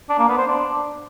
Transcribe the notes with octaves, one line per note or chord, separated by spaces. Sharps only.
D4
A#3
B3
C5
D4